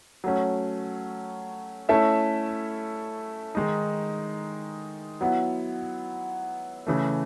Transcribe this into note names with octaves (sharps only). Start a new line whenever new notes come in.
F#3 A3 C#4
A3 C#4 E4 A4 E5
D#3 G#3 D#4
F#3 B3 E4
C#3 E3 A3